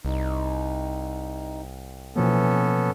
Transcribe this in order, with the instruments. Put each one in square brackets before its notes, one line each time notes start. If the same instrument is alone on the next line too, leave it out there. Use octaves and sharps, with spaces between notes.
[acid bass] C2 [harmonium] D#4
[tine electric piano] B2 F3 A#3 [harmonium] E3 [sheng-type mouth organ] B3 C#4 A4